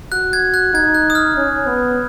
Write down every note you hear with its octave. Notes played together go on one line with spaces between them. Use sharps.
F#4 F#6
G#6
F#6
D#4 G#6
F#6
D#6
F6
C#4
B3